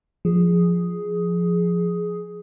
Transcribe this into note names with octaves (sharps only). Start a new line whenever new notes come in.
F3 G#4